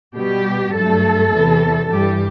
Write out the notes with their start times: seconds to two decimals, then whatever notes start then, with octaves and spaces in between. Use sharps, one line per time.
0.16 B2 G3 G4
0.74 G2 F#3 A3 A4
1.32 E2 C3 E3
1.90 G2 E3 G3 G4